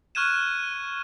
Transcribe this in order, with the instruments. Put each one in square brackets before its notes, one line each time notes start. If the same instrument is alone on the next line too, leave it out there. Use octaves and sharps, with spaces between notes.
[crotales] C#6 F6 F#6 G#6 D#7 E7